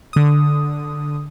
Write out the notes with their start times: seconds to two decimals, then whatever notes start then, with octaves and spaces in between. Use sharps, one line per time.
0.13 D3 D#6